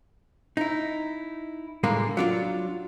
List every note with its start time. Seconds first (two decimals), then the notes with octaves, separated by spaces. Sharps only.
0.57 D#4 E4
1.84 A2 D3 G3 G#3 A#3
2.17 F#3 D4 F4